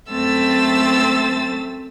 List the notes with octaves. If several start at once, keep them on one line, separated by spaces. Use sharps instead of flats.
F#2 A3 C4 E6 A6